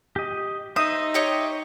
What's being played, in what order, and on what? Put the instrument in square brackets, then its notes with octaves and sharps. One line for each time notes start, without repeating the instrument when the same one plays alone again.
[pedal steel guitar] G4 D#5
[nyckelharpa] D#4 [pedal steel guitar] C5 E5 [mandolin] D#6
[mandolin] G4 C#5 D#5